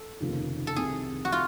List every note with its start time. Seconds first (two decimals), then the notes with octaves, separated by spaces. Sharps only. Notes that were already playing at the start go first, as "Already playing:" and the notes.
Already playing: A4
0.20 F1 D#2 C#3 F3 A#3
0.67 A4
0.76 C2 C3 D#3 G#4
1.25 F#4
1.32 F4